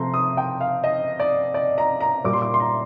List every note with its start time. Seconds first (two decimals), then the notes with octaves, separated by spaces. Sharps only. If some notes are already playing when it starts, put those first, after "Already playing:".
Already playing: C3 F3 A3 A#5 C6
0.14 D#6
0.37 G5
0.61 F5
0.84 D#5
1.20 D5
1.54 D5
1.78 A#5
2.01 A#5
2.24 A#2 G3 D6
2.33 C6
2.42 D6
2.54 C6
2.60 A#5